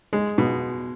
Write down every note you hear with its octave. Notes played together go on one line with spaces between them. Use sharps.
G#3
B2